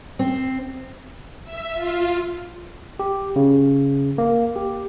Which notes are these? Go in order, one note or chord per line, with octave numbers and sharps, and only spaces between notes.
C4
E5
F4
G4
C#3
A#3
G4